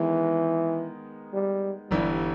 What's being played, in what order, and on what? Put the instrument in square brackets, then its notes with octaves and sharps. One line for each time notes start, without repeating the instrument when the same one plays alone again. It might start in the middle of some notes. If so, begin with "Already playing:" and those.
Already playing: [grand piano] D#3 G#3 B3 D#4 [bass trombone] E3
[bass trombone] G3
[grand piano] G1 G2 E3 [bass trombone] G3